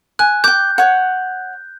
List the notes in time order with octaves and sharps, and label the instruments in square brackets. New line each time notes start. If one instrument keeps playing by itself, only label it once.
[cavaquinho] G#5 [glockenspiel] F#6
[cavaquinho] G5 D6 [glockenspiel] G6
[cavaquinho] C#5 F#5